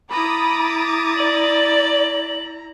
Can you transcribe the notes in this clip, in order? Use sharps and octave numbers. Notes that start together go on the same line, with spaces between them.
E4 A#5 B5 D6 D#6 A6
D5 F#7